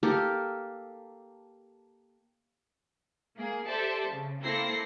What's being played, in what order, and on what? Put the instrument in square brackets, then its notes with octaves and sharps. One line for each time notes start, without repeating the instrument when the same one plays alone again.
[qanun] A#3 G4 A4 A#4
[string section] A#3 G#4
G4 A4 C5 D5 E5 A5
C#3
A#3 C4 E4 A4 A#6 C7